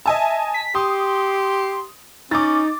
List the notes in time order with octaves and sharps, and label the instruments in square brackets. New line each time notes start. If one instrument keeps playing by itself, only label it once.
[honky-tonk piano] D#5 G#5 A5 [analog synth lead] E5
[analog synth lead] B6
[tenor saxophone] G4 [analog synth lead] C6 [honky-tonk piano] D#6
[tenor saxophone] C#4 [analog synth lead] D#4 [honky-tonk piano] D6 A6